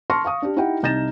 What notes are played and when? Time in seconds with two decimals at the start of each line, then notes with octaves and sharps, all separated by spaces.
0.10 A5 C6 C#6 F6 A#6 C#7
0.25 F5 C#6 D#6
0.42 D4 G4
0.56 D#4 E4 G4 E5 F#5 G5
0.83 C2 D#4 G6 A6 A#6 E7